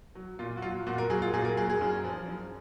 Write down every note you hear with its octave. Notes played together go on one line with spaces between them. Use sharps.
F#3
A#2 F4
F#4
F#3 F4
A#2 F#4
A#4
F#3 G#4
F4
A#2 G#4
A#4
F#3 G#4
G#4
F#2
F3
F#2